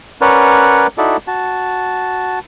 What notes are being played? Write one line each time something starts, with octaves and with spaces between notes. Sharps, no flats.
C#4 A#4 B4 C#5 D5 F#5
D#4 E4 F#4 A4 D5
F#4 A5